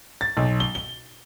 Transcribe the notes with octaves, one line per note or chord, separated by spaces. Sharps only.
A6
B1
G7
G7